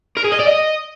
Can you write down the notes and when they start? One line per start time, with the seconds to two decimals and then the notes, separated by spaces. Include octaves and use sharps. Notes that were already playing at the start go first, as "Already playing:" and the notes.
0.17 A#4
0.24 G#4
0.32 D#5
0.40 D5
0.47 D#5